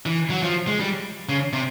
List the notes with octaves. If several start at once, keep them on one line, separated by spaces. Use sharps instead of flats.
E3
F#3
F3
G#3
G3
C#3
C3